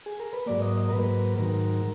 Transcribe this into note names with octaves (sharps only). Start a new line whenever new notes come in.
G#4
A#4
B4
G#2 F#3 A#3 D5
D#5
D#5
A#4
G#2 F#3 A#3 B4
G#2 D#3 F#3 A#4